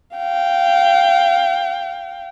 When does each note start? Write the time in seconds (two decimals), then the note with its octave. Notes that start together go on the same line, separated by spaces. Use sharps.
0.17 F5 G5